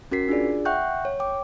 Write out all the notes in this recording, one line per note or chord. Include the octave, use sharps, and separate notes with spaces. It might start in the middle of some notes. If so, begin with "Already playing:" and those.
C#4 F#4 A#4 B6 C7
D4 F4 G#4 D5
E5 F#5 G5 C#6 F#6 G6
C#5
G5 D6